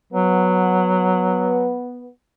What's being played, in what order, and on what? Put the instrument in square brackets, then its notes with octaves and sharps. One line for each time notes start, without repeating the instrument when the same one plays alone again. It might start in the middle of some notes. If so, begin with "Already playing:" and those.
[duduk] F#3 [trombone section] B3